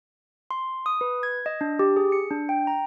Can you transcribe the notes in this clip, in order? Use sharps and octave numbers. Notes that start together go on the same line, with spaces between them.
C6
D#6
B4
G#6
D#5
D4
G4
G#4
C#7
D4
G5
A#5